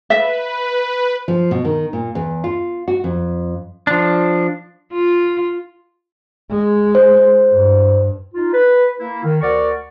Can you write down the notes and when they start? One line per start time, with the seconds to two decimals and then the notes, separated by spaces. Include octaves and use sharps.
0.10 B4 E5
1.28 F3
1.51 B2
1.65 D#3
1.93 A#2
2.15 E2
2.44 F4
2.88 F#4
3.04 F2
3.87 F3 D4
4.92 F4
6.51 G#3
6.95 C5
7.52 G2
8.34 D#4 F4
8.54 B4
9.00 A#3 E4
9.24 D#3
9.41 D2 A#4 D5 F#5 C#6